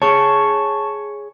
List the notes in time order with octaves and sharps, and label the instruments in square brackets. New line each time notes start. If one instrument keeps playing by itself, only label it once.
[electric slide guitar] G#4 C#5 [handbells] A5 C#6